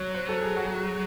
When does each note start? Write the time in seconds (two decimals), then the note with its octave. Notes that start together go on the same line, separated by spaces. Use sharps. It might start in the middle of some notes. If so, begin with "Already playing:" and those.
Already playing: F#3 C#5
0.15 C5
0.29 A4
0.43 G#4
0.57 F#4
0.66 G#4
0.75 F#4